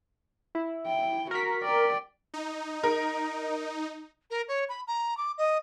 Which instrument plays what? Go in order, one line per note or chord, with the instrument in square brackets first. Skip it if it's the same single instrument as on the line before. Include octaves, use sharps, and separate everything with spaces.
[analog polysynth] E4
[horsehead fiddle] G5
[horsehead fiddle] F#4 [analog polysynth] A#4 B6
[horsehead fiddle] D5 G5
[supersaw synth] D#4
[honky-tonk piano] A#4
[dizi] A#4
C#5
B5
A#5
D6
D#5